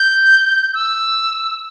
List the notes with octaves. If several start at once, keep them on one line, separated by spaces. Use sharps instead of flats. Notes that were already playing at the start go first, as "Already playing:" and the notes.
Already playing: G6
E6